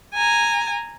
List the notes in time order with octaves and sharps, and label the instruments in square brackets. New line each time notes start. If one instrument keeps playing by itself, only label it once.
[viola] G#5 A#5